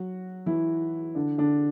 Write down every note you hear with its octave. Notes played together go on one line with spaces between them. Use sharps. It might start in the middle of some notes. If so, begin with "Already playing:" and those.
Already playing: F#3 F#4
E3 E4
D3 D4
D3 D4